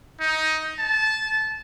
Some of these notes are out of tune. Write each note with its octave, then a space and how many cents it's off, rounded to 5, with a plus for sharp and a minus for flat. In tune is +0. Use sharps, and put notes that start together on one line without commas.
D#4 +15
A5 -20